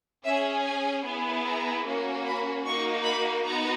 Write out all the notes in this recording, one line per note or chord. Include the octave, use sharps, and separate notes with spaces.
C#4 G#4 E5
G#5
B3 E4 G#4
A#5
A#3 C#4 F#4
B5
A#3 D#4 F#4 C#6
B5
B3 D#4 F#4 A#5